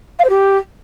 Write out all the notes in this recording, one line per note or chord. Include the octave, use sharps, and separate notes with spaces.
F5
C5
G4